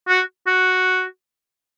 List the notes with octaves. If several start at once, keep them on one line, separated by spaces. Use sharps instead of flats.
F#4
F#4